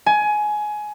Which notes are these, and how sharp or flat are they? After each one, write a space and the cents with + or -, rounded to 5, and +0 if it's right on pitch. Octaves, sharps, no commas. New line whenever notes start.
G#5 +20